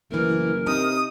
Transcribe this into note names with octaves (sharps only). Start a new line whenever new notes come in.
F#1 E3 A3 A#4
C3 D#4 D#6